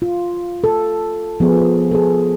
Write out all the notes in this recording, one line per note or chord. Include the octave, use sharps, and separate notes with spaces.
F4
A4
F3 B3 G#4
G#4 A4